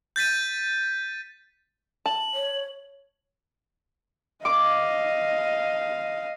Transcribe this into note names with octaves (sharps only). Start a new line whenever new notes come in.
G6 A6 B6 D#7
A5 F#7
C#5
D#5 F5 D6